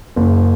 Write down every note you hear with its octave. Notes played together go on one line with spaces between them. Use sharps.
F#1